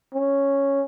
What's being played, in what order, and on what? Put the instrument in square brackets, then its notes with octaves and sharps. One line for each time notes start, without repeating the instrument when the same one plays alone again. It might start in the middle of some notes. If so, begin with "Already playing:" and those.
[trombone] C#4